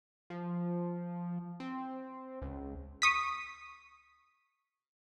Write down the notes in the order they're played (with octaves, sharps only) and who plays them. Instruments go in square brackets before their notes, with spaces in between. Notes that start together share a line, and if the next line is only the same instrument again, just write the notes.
[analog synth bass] F3
C4
C#2
[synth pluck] C#6 D#6 B6